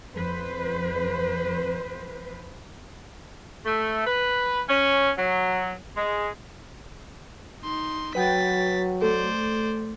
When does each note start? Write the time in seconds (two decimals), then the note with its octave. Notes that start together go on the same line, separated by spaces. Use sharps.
0.13 F2 B4 C5
3.66 A3
4.06 B4
4.69 C#4
5.18 F#3
5.97 G#3
7.63 D#4 C6
8.15 F#3 B4 F#5 G5 A6 B6
9.02 A3 A4 C5 D5